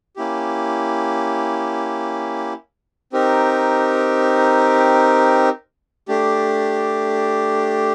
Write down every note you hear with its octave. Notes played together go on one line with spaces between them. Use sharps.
A#3 C#4 E4 G4
C4 D#4 G4 A#4
A3 D4 G4